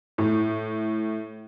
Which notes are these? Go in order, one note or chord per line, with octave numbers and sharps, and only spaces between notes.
A2